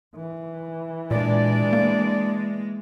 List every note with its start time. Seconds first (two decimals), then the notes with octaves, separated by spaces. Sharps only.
0.16 E3
1.11 A#2 G#3 D4 D5
1.73 A#3